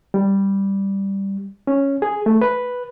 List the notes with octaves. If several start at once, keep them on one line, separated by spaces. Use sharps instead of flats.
G3
C#4
G#4
A3
B4